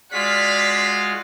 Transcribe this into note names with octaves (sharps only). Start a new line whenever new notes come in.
G#3 F4 F#4 C5 D5 F5 B6